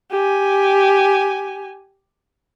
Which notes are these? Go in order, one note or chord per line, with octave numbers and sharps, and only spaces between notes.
G4 G#5